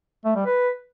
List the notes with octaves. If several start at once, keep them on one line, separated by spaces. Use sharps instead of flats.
A3
G3
B4